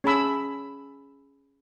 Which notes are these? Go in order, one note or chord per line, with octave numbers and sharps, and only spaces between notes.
C#4 G#4 A5 B5 E6